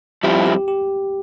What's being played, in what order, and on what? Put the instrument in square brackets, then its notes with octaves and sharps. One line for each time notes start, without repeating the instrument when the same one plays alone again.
[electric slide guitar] G2 F3 C4 E4 [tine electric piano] G4
[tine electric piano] G4
G4